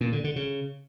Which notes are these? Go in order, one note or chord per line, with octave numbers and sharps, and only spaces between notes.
A#2
D3
D3
C#3